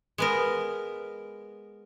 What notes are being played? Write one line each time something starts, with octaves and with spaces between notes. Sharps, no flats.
G#3 B3 A#4